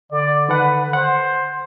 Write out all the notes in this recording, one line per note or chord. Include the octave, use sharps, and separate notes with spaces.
D3 D5
D#3 A4 B4 F#5
C5 F#5